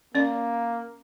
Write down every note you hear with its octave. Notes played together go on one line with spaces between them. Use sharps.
A#3 C#4 D5